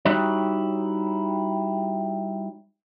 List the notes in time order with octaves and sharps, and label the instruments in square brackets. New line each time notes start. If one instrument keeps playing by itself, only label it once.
[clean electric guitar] G3 D#4 E4 F#4 G4 C#5